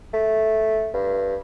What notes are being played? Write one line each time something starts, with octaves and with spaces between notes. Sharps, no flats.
A3
G2